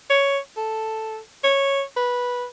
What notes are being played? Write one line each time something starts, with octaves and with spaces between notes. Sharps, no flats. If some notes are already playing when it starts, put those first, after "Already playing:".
C#5
A4
C#5
B4